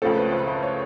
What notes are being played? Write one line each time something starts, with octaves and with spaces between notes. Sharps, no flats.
C#2 C#3 F3 A3 C4 A4
B4
C5
C5
C#5